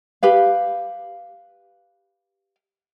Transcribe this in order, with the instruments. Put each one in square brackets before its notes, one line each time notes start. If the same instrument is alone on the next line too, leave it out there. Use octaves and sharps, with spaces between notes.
[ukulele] G4 B4 F5